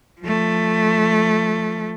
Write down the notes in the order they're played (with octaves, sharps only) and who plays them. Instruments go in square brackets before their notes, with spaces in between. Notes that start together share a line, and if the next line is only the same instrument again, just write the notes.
[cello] F3 A3